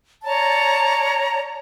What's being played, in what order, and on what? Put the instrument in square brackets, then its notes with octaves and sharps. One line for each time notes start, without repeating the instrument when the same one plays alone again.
[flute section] C#5 D5 A5 A#5